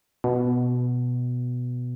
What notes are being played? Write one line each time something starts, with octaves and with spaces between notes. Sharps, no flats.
B2